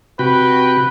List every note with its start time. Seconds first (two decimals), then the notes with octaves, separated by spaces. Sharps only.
0.19 C3 F#4 B4 G5